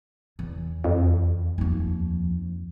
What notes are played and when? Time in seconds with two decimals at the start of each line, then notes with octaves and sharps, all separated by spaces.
0.39 E2
0.84 F2
1.58 D#2 F3